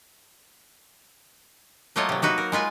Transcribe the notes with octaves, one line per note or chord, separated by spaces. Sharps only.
F#3 A3 A#3 F4 C#5 D#5
C3 F#3
A#3 D#4 F#4 B4
A#4
G#3 F4 B4 G#5